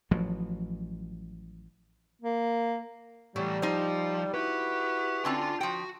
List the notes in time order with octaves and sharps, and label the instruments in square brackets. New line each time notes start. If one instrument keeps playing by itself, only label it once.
[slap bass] A1 F3 F#3
[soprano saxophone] A#3
[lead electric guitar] A2 E3 [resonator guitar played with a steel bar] F#3 [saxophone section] G3
[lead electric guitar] F3 [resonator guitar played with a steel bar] D#4 C5
[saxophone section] E4 F#4 B4 [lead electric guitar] G4
[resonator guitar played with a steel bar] D3 C4 C#4 [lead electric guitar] F4 C6
[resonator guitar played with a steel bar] F3 G5 [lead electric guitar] F#4